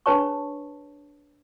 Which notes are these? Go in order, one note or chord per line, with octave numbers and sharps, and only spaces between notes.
D4 G#4 B4 C#5 A5 C#6